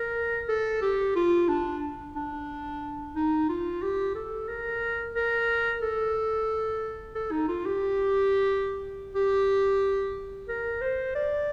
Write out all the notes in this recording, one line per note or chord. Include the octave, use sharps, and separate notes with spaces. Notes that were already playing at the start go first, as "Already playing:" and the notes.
Already playing: A#4
A4
G4
F4
D4
D4
D#4
F4
G4
A4
A#4
A#4
A4
A4
D#4
F4
G4
G4
A#4
C5
D5